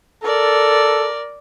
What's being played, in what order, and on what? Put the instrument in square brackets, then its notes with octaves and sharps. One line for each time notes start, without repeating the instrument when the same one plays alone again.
[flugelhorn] A4 [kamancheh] A#4 D5